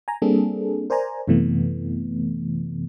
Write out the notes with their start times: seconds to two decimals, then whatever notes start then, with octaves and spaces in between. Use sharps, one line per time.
0.08 G#5 A#5
0.22 G3 A#3 C4 D4 G#4 A4
0.90 A#4 C5 D5 G#5 A#5
1.28 F#2 C3 E3 A3 B3